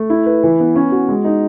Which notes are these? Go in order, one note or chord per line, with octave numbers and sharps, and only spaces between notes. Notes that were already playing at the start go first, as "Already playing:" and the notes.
Already playing: A3
E4
B4
E3
B3
C#4
F#4
G#3
D#4